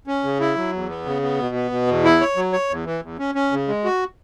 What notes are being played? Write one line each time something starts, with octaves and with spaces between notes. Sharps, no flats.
C#4
C#3
E4
F#3
E2
B3
C#3
B3
B2
B3
B2
E2
E4
C#5
F#3
C#5
E2
E3
E2
C#4
C#4
C#3
G#3
F#4